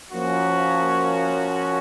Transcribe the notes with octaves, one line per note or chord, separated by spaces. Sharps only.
F3 A#3 C#4 F#4